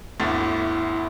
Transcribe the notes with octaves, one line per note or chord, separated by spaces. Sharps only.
G1 D2 E4 A6